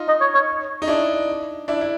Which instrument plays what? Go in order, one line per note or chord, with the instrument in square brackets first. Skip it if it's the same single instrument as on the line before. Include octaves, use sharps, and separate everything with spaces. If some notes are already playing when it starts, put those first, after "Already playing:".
Already playing: [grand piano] D#4 F4
[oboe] D#5
C#5
C#5
[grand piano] D#4
D4 E4
D4 E4
E4